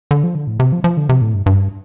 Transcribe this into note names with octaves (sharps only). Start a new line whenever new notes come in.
D3
F3
D3
A2
C3
F3
F3
D3
C3
A2
G2
G2